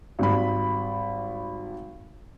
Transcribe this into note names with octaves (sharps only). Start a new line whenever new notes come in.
G#1 G3 B5